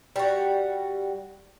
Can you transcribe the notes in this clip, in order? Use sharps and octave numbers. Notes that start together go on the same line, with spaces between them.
G3 F#4